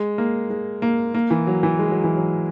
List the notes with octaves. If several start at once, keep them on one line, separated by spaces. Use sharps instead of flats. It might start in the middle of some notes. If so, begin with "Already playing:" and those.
Already playing: G#3
A#3
G#3
A#3
A#3
E3
F#3
E3
G#3
F#3
E3
F#3